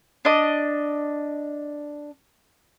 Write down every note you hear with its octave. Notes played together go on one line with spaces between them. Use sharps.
D4 D#5